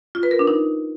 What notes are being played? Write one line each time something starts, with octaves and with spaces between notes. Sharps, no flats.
F4
B4
A#4
D4
D#4